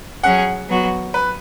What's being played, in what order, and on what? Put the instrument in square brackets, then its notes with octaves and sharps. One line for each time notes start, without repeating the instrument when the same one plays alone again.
[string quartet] F#3 C#4 G#4 [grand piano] F#5
[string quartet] F#3 B3 F#4
[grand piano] B4